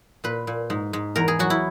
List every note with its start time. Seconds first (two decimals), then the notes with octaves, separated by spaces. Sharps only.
0.24 A#2 B4
0.47 A#2
0.70 G#2
0.93 G#2
1.16 E2 A#4
1.28 G#4
1.39 F#3 F#4
1.50 E4